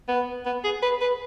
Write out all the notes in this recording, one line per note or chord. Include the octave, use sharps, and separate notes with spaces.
B3
B3
G#4
B4
B4